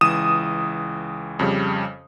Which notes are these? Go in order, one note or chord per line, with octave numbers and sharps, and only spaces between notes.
C#2 E3 D#6 D#7 E7
F2 C#3 G3